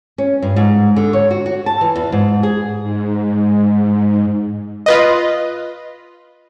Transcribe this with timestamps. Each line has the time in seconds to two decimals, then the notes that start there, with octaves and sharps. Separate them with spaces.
0.18 C#4
0.42 G2
0.56 G#2
0.96 D3
1.13 C#5
1.31 F#4
1.46 F#4
1.66 A5
1.81 E3
1.96 E2
2.12 G#2
2.43 G#4
2.82 G#2
4.86 F4 B4 D#5